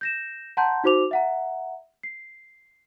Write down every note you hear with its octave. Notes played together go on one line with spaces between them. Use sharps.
G6 A#6 E7
F#5 A5 A#5 C6 G6
D#4 F#4 C5 D6 F7
E5 F#5 A#5
C7